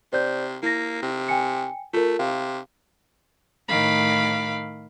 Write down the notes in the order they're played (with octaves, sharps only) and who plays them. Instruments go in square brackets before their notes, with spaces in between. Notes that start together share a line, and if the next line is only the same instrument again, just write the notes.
[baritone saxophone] C3 [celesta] C5 D5 G6
[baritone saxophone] A#3 [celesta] E4 A#6
[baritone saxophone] C3
[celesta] G5 G#5 C#7
[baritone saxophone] A3 [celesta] F4 A#4
[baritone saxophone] C3 [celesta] F5
[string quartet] A2 D#3 F5 B5 D6